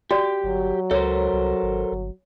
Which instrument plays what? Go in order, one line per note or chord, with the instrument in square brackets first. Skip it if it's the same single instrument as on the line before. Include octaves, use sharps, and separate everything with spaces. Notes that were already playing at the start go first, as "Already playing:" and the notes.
[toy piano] F#4 D5 [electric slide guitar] G4
[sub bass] G1 [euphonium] F#3
[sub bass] C#2 [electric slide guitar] A4 A#4 C5 [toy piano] C#5
[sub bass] C2
G#1
G1